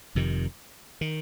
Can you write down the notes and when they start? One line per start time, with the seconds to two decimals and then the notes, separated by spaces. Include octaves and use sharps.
0.15 F1 F2 C3 D#3
1.01 D#3